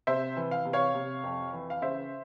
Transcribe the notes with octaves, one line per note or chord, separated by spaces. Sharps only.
C3 C5 E5
E3
F5
C3
C#5 F5
C3
F2
E3
F5
C#3 C5 E5